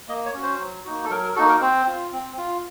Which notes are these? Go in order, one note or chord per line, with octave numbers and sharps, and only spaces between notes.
A#3 D#5
C#5
C#4 F#4
C5
F#3
A#3 D#4 F#4
A4
F#3 A#4
A#4
A#3 D#4 F#4 A4
A#4
C4 C5
F4
C4
F4